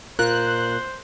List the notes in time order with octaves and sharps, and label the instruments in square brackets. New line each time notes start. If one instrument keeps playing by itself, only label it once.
[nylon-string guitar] A#2 F4 A#4 [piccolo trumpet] C5 [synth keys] F#6